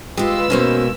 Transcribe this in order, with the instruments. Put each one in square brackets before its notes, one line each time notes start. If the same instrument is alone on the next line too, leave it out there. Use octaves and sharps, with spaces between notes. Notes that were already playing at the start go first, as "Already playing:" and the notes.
[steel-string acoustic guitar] G#3 F4 [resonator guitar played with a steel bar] G4 [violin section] B4 E6
[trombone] B2 [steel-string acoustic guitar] D#3 G#3 A#3 [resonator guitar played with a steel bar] C#4 C5